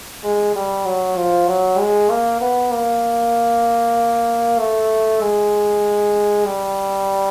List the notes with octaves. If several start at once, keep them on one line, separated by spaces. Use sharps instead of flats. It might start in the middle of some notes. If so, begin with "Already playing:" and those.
G#3
G3
F#3
F3
F#3
G#3
A#3
B3
A#3
A3
G#3
G3